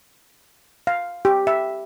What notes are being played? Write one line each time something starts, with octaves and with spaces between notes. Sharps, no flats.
F5
G4
E5